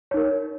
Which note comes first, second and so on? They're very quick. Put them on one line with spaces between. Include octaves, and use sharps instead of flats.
C#5 D#4 A#4